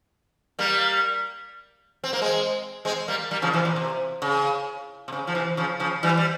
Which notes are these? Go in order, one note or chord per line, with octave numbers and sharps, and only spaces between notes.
G3 A#3
C4
A#3
G#3 C4
G#3 C4
G3 A#3
G3 A#3
C#3 F3
C3 E3
A#2
C3
C#3
C3
C#3
F3
C3 E3
C#3 F3
C#3 F3
E3 G3
G3